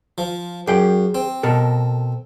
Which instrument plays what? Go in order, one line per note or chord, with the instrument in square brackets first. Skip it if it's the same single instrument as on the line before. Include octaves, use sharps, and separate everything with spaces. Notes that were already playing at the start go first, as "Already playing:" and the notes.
[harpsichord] F3
[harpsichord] F#2 [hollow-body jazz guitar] G4 G#4 G5
[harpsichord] C4
[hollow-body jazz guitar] B2 A4 A#4